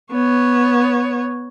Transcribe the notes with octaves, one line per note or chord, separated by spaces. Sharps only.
B3 C#5